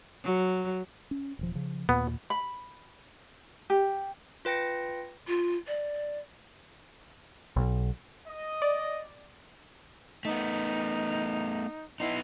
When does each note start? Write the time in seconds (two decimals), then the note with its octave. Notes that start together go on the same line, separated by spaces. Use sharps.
0.24 F#3
1.11 C#4
1.39 D#1 F3
1.55 C#3 F3
1.89 D#2 A#2 B3
2.30 B5
3.70 G4
4.45 F4 B4 G5 A#6 C#7
5.28 F4
5.67 D5
7.56 B1
8.27 D#5
8.62 D5
10.25 A3 B3 D#4
12.00 B3 D#4 E4 D#5 C6